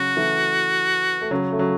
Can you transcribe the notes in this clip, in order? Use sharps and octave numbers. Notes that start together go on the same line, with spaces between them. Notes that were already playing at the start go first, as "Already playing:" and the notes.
Already playing: C#3 F#3 F#4
E3 A3
A3
C#3 F#3
A3
C#3 F#3